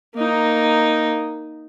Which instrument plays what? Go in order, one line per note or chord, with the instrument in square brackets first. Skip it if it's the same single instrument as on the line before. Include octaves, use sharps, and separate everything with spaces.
[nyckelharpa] A#3 D#4